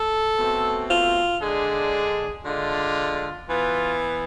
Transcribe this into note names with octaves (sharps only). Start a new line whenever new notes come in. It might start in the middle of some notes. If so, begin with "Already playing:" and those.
Already playing: A4
B2 A3 C4
F4
D3 G#3 D4 G#4
D3 G#3 D4 F4
E3 B3 F4